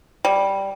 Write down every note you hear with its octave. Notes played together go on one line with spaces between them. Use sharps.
G3